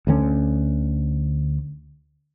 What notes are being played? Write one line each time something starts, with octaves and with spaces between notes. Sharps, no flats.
D2 D3 G3 C#4